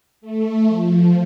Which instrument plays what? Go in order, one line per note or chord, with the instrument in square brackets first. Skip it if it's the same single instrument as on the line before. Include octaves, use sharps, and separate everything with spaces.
[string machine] A3
F3